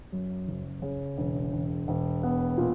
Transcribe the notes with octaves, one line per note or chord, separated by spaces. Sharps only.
F#2
F#1
C#3
E1
E1
E1
B3
A#2